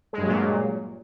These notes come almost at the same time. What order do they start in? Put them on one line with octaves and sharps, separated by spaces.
G#3 G2 F#3 A#2